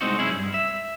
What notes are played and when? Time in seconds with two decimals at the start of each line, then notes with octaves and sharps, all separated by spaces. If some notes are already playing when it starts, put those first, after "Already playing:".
0.01 C2 A#2 G#3 C4 D#4 F#4
0.19 C2 F#2 C#4 E4 G#4
0.31 G2
0.54 E5